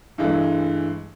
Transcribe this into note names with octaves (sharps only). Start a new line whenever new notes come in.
G2 E3 G#3 A3